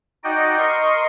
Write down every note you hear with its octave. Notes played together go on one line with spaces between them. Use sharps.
D#4 F#4 D5 D#5 G5
A#4 D#5 C6 C#6